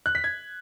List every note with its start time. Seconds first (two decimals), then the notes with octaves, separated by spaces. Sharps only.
0.06 F#6
0.15 B6
0.24 G#6